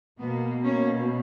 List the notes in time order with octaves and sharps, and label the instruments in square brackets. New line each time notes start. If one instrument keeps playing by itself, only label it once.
[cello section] B2 A#3 B3
A#3 C#4